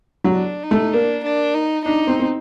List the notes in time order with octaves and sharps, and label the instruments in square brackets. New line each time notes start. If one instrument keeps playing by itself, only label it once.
[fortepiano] F#3
[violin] D4
D#4
[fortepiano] A3
[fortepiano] A#3 [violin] D4
[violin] D4
D#4
[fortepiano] D4 [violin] D#4
[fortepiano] C4
C4